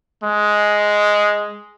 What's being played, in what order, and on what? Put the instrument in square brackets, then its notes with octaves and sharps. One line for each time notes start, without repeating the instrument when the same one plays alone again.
[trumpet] G#3